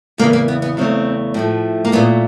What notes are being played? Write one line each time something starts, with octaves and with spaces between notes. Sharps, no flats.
E2 C#3 E3 A#3
A#3
B3
B3
E2 C#3 F#3 A3 C4
A2 F3 A3
A#3
A#2 F#3 A3 B3